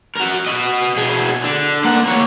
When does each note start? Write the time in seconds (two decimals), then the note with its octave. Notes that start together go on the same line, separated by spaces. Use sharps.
0.15 F#4 A#4
0.46 F#4 D#5
0.97 B2 G#4
1.44 D3
1.84 A#3 F#5
2.05 A#3 C#5